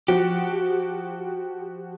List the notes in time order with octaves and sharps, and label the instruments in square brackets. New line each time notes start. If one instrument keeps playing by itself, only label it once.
[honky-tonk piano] F3 F#4 [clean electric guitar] G4